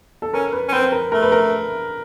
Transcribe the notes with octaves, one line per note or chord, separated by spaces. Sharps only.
A4
C#4 A#4
B4
C#4
C4 B4
A#4
A3 A#4
B4
A#4